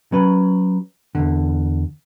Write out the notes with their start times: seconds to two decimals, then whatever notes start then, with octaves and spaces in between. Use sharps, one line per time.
0.12 F#3 C#4 B4
1.15 E2 G2 D3